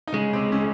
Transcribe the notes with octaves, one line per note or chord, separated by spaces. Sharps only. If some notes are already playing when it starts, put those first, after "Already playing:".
D#4
C#3 G#3 C#4
C3 C4
C#3 C#4